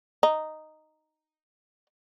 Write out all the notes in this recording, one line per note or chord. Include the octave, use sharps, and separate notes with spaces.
D#4